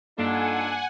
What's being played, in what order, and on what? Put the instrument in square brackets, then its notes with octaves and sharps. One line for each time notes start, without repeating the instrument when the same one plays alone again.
[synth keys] G2 A#3 [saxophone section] D4 [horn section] D#4 F4 A4 [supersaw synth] F#5 G#5